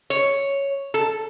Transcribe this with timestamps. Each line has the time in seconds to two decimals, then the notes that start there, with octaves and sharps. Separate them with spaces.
0.10 C#5
0.94 A4